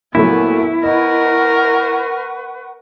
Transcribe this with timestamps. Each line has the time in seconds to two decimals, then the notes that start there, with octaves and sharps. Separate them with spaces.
0.15 A#2 F#3 A3 B3 E4
0.83 A#4 B4 D#5 F#5 C#6